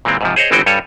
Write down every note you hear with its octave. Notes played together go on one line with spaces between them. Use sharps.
A#2 E3 G#3 C4
G#2 C3 F3
G#4 C5 C#5 D#5
G1 E3 G#3 C4 F#4 G5
G2 G3 A4 C#5 G#5